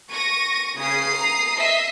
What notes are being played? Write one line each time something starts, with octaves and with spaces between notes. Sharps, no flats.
C#6 A#6 D#7
C#3 D#6 C7
A#5
D#5 E5 B6